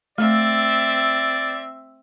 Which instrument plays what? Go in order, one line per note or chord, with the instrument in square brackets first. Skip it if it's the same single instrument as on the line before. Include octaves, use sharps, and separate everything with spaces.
[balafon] A3 [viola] C4 E5 [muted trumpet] D5